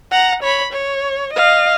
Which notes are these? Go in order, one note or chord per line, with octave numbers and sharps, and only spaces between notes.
F#5 A#5
C#5 B5
C#5
D#5 F5